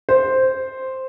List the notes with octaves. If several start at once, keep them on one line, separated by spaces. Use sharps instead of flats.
C5